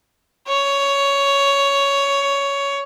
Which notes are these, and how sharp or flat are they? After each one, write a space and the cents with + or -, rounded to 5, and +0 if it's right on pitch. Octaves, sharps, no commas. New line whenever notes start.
C#5 +10